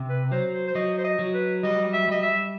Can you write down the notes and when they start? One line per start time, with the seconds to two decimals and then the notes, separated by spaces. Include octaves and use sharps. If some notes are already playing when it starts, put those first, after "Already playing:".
Already playing: C3
0.10 B4
0.31 F#3 C5
0.53 C5
0.68 C5
0.75 F#3 D#5
0.98 C5
1.04 D#5
1.19 F#3
1.34 B4
1.63 G3 D#5
1.93 E5
2.08 G3 D#5
2.23 E5